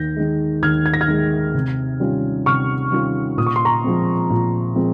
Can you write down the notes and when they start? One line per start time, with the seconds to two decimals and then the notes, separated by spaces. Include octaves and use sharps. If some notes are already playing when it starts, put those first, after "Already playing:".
Already playing: D#2 G6 A#6
0.16 D#3 G#3
0.62 D#2 F6 G#6
0.86 G#6
0.94 A#6
1.01 F6 G#6
1.08 D#3 G#3
1.54 C3
2.00 D#3 G3 C#4 F4
2.46 C3 C#6 F6
2.92 D#3 G3 C#4 F4
3.37 A#2 D#6
3.47 C#6
3.56 C6
3.65 A#5 C#6
3.84 F3 G#3 C4
4.30 A#2
4.75 F3 G#3 C4